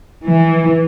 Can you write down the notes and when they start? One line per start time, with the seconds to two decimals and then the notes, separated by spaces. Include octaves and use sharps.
0.23 E3